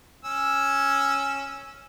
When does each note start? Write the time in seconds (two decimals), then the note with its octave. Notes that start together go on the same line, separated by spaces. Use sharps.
0.25 C#4 E6